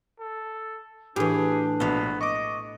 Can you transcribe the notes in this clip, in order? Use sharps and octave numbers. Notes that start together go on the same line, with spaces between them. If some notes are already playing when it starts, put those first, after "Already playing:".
A4
A2 E3 D4 G4 G#4
A#1 B2 B3 F5 C6
D#5 C#6 D6